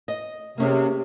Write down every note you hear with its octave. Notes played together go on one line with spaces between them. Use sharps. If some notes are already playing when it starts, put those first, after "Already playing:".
D#5
C3 A#3 C#4 G#4